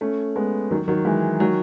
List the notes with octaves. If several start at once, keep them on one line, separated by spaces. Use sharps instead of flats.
A3 C#4
G#3 B3
D#3 F#3
D#3 F#3
E3 G#3
D#3 F#3